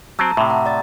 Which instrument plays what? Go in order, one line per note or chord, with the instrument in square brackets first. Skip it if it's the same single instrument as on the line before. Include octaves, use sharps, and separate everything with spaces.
[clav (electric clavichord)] F#3 C4 [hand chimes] A5 A#5 E6
[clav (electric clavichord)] A2 C3 [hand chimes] E5
[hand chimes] F#5 A#5
D5 A6